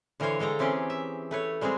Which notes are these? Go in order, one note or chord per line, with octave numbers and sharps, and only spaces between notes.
D3 E3 A#4 C5 C#5 F5
D3 G#3 A4 G5 A#5
E3 C4 C#4 G4 G#4
E5
A3 B4 C#5
G3 G#3 C4 F#4 G#4